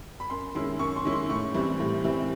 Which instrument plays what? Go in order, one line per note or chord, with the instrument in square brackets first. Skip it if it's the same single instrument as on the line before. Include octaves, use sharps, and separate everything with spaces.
[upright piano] B5
F#2 C6
D#3 G#3 C#4 E4 C6
F#2 C#6
C6
D#3 G#3 C#4 E4
C6
A2 C#6
E3 G3 C4
A2
E3 G3 C4